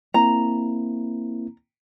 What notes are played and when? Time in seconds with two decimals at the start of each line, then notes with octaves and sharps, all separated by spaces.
0.14 A#3 C4 E4 A#5